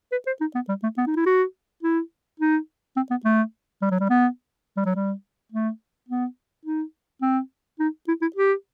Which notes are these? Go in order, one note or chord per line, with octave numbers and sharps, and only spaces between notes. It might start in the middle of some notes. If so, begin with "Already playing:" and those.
B4
C5
D#4
B3
G3
A3
B3
D#4
E4
F#4
E4
D#4
C4
B3
A3
G3
F#3
G3
B3
G3
F#3
G3
A3
B3
D#4
C4
D#4
E4
E4
G4